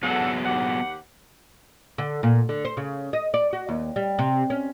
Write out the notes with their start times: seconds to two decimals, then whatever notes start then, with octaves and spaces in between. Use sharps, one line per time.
0.03 F#3 B3 G#4 A4 F#5
0.46 D#2 G4 F#5
1.98 D3
2.23 A#2
2.49 D3
2.65 C5
2.77 C#3
3.13 D#5
3.34 D5
3.53 F#4
3.69 D#2
3.96 G3
4.19 C3
4.50 C#4